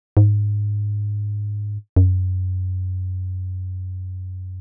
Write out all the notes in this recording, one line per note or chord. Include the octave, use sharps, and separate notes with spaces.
G#2
F#2